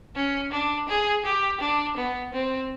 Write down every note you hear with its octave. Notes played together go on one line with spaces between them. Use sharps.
C#4
D4
G#4
G4
D4
B3
C4